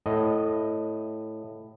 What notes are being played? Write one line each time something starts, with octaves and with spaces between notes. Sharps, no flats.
A2 D#5